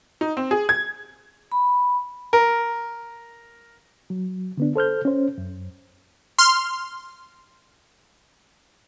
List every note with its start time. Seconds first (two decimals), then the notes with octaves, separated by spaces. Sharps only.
0.21 D#4
0.37 C4
0.51 G#4
0.69 G#6
1.52 B5
2.33 A#4
4.10 F#3
4.57 D3 B3 D4
4.76 A4 C5 F6 G6
5.05 C#4 C5
5.38 F#2
6.39 C6 F6